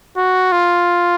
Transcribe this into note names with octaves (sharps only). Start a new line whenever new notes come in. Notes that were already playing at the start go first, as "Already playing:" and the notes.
F#4
F4